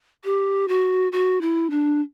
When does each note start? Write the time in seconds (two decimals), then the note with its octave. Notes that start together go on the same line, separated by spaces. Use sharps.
0.24 G4
0.68 F#4
1.12 F#4
1.41 E4
1.70 D4